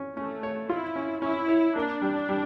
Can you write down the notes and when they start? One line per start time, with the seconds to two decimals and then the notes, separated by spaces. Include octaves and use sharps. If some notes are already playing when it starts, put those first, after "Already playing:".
Already playing: C#4
0.16 A3 C#4
0.43 C#5
0.70 E4 F4
0.96 C#4
1.22 C#4 E4
1.48 C#5
1.75 A#3 D4
2.02 G3
2.29 G3